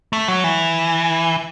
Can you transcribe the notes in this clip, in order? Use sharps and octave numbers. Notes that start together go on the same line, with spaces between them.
A3
F#3
E3